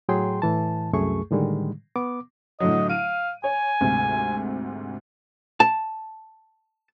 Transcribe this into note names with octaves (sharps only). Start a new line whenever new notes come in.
A2 F#3 G#4 G5 C6
A2 E3 A5
C2 F#2 A3 G#4 C#6
A2 D3 D#3 G3 G#3
B3 D6
A2 D3 F#3 D#5
F5 D7 D#7
C#5 G#5
D2 G#2 C3
A5